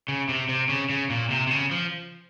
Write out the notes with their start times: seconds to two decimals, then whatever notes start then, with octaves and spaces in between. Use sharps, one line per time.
0.08 C#3
0.29 C3
0.49 C3
0.69 C#3
0.90 C#3
1.10 A#2
1.30 C3
1.47 C3
1.51 C#3
1.71 F3